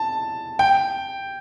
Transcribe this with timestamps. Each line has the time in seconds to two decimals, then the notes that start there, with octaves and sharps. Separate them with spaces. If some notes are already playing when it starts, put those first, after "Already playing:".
Already playing: A5
0.59 G5